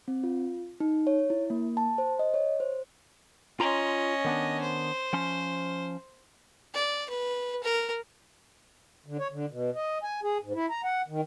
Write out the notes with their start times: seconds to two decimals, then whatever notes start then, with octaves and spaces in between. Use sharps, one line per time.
0.08 C4
0.24 F4
0.80 D#4
1.07 C#5
1.30 E4
1.50 A#3
1.77 A5
1.98 C5
2.19 D#5
2.34 C#5
2.60 C5
3.60 C#4 F4 D#5 A#5 C6
4.25 D#3 B3 D4
4.61 C5
5.13 F3 C#4 C6
6.74 D5
7.10 B4
7.63 A#4
9.06 D3
9.19 C#5
9.31 D3
9.51 B2
9.75 D#5
10.03 G#5
10.23 G#4
10.43 G#2
10.55 E4
10.70 A#5
10.84 F#5
11.08 D#3